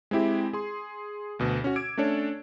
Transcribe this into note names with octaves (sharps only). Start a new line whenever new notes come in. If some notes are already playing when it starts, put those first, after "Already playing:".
G#3 C4 E4 G4
G#4 C6
D2 B2
C#4 F#4
D6 E6 G#6 D7
A3 C#4 D4 A4 C#5